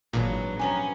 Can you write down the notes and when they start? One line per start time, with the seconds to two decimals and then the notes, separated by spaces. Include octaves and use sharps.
0.13 G#1 E2 A#2 F#3 B3 D4
0.59 F3 B3 C#4 G4 G#5 A#5